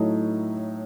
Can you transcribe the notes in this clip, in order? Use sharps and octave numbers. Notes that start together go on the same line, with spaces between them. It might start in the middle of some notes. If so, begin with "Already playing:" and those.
Already playing: A2 F#3 A3 D#4